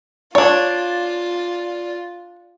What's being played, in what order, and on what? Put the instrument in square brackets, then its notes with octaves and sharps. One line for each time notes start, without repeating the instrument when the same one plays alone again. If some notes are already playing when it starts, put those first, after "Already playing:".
[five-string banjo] D4 C#5 [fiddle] F4 [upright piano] D5